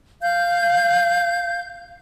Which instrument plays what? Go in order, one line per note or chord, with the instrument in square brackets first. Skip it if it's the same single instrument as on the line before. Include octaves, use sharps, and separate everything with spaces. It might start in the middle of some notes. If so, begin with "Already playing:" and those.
[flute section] F5 G6